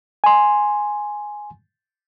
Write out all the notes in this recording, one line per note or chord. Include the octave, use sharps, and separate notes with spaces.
G#5 C6